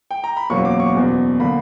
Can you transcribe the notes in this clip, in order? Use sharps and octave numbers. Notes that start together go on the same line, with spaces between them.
G5
A#5
B5
F#1 E2 B2 F#3 A#3 C#6
D6
C#6
F#1 E2 B2
D3 A#3 B5